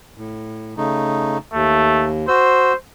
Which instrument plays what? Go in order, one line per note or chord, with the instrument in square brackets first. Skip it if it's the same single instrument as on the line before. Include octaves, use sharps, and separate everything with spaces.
[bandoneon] A2
C#3 A3 D#4
[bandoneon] D#2 [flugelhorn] A3
[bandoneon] F#4 E6 [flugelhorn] C5